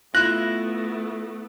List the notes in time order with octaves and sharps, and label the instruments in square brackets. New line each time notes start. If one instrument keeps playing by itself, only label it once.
[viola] A3 B3 [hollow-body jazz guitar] E4 F4 [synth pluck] F#6 [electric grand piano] A#6